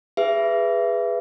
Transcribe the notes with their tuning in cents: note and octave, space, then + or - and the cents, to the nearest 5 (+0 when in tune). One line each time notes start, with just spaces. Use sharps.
G#4 -15 B4 +0 E5 +25